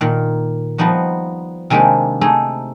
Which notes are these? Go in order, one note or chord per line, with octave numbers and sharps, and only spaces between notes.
A#2 D#3
F3 G3 B3 D#4 F#4
C3 D#3 G#3 A#3 D4 G4
A3 D#4 G#4